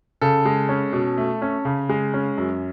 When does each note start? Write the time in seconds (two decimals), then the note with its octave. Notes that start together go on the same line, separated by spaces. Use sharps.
0.21 C#3 A4
0.45 G#3
0.69 C#4
0.93 B2
1.17 A3
1.42 C#4
1.65 C#3
1.89 G#3
2.14 C#4
2.38 F#2